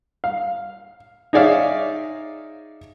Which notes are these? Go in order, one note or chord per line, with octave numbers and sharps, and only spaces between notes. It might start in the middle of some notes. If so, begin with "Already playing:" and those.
F5
D#4 G#4 C#5 D5 E5 F5